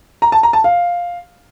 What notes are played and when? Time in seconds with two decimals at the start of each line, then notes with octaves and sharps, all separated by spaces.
0.22 A#5
0.32 A5
0.43 A#5
0.53 A5
0.64 F5